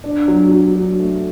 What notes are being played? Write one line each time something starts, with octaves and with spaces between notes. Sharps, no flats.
D4
F#3
F#3
F#3
A3